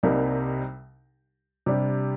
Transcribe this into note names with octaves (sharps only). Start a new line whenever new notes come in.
C2 C3 G3 A#3 D#4
C3 G3 D4